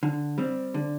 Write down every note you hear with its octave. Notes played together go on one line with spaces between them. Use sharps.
D3
G3 C4
D3